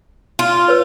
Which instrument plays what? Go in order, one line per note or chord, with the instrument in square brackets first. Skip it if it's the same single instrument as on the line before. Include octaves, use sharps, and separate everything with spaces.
[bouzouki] F4
[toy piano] B4 C#5